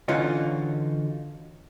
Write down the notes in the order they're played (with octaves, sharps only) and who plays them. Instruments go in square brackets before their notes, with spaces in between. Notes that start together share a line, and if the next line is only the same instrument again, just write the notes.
[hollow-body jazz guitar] D3 E3 C#4 D#4 F4 F#4